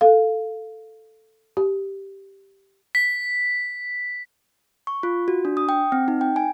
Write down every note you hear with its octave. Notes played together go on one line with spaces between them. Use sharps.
A4 F5
G4
B6
C#6
F4
F#4
D4
D#6
G5
C4
D#4
G5
G#5